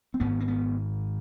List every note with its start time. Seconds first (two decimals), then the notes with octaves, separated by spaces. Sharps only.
0.14 C4
0.20 G#1 G#2 B3
0.40 C4
0.48 B3